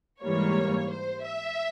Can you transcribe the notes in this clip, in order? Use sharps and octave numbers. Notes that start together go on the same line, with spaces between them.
G#2 E3 G3 A#3 C#5
C5
E5